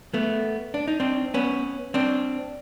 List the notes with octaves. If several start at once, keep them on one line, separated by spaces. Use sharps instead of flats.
A3 B3
D4
D#4
C4 D4
B3 C#4
C4 D4